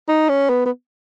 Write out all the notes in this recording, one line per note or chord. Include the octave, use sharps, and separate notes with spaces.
D#4
C#4
B3
B3